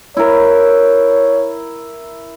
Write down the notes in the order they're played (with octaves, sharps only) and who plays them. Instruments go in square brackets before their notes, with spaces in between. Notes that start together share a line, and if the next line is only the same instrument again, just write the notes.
[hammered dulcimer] E4 A#4 [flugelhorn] C#5